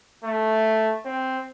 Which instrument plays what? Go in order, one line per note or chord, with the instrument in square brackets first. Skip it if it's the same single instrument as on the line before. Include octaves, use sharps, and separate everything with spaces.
[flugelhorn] A3
C4